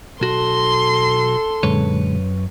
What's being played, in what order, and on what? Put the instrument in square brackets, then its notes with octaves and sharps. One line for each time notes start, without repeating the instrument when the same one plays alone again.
[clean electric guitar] B1 F#4 [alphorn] A4 [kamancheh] C6
[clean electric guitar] F#2 B4 C#5 [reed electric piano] A#2 D3 G#3